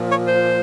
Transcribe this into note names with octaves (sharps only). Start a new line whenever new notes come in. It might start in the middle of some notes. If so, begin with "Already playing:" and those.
Already playing: A#2 F3
C#5
C5